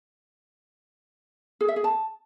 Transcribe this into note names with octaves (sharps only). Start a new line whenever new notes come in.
G#4
E5
G#4
A5